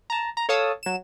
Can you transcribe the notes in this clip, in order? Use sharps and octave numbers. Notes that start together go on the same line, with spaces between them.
A5 A#5
A#5
A4 C#5 F5 A5 D#6 E6
F#3 E7